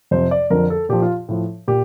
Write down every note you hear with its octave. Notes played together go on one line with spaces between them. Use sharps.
F2 C3 F3 C5
D5
F2 D3 F3 A#4
A4
A#2 F3 G4
F4
A2 F3
A#2 G4